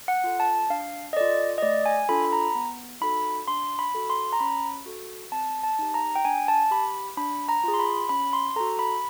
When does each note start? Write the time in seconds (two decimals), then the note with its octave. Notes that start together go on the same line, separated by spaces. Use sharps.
0.08 F#5
0.24 F4 A4
0.40 A5
0.70 D4 F5
1.13 D#5
1.17 F4 A4 D5
1.58 D#5
1.62 A3 D5
1.86 G#5
2.09 D4 F4 A4 B5
2.25 B5
2.33 A#5
2.55 B3
3.01 D#4 F#4 A4 B5
3.48 D4 C6
3.79 B5
3.94 F#4 A4
4.10 C6
4.32 A#5
4.40 C#4 B5
4.86 F#4 A4
5.32 C4 A5
5.63 A5
5.79 D#4 G4
5.94 A#5
6.15 G5
6.25 D4 G#5
6.48 A5
6.71 G4 B5
7.17 D4 B5
7.49 A#5
7.64 F4 G#4
7.74 C6
7.79 B5
8.09 C#4 B5
8.33 C6
8.56 A4 A#5
8.60 F#4
8.79 B5